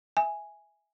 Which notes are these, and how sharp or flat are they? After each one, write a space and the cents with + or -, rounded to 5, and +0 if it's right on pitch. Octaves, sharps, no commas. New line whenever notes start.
E5 +0 G#5 +0